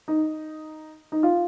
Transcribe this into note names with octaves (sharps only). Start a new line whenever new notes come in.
D#4
D#4
F4